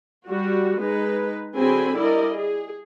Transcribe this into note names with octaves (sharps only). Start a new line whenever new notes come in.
G3 F#4
G#3 D#4 B4
D3 F#3 C4 G#4 G#5 B5
G3 E4 A#4 D5 D#5
G#4